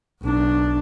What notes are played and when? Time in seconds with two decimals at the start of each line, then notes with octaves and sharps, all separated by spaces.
0.22 B1 D4